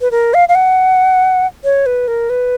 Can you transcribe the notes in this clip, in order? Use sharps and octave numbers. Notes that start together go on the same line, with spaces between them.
B4
A#4
F5
F5
F#5
C#5
B4
A#4
B4